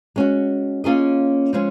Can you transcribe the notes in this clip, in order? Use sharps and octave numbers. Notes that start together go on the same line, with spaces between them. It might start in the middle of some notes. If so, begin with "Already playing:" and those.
G#3 C#4 F#4
A#3 C#4 F4 G#4 D#5
F3 G#3 C#4 G#4